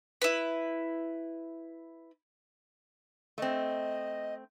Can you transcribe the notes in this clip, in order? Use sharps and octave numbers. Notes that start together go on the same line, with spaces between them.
E4 B4
A3 C4 D#5